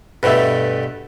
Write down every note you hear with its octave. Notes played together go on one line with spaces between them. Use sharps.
G2 B2 A3 B4 E5